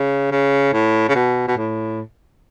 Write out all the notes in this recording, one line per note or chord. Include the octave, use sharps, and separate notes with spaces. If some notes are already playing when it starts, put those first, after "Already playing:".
Already playing: C#3
C#3
A2
C#3
B2
B2
A2